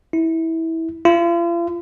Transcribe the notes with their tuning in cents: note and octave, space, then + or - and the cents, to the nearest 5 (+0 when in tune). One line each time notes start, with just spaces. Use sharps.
E4 -20
F4 -40